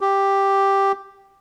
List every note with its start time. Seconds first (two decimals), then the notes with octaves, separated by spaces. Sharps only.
0.01 G4